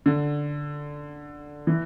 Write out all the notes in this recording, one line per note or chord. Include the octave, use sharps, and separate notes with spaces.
D3
E3